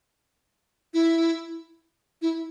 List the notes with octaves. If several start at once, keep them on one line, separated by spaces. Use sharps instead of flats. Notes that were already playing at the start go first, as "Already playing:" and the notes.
E4
E4